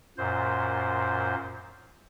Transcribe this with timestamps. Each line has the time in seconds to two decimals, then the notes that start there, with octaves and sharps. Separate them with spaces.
0.18 F#2 A#2 C5